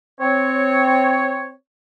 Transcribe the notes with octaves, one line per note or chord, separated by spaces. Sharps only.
C4 C#5